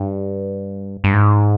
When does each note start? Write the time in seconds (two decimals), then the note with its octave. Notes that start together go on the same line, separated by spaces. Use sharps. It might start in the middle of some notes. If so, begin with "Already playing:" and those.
Already playing: G2
1.04 G2
1.13 G#2